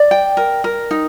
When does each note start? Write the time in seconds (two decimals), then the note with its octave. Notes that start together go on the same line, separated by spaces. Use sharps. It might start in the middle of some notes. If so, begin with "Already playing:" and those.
Already playing: D5
0.11 G5
0.37 A#4
0.64 A#4
0.91 D#4